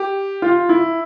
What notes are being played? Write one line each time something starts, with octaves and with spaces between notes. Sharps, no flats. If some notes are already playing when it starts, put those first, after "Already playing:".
Already playing: G4
F4
E4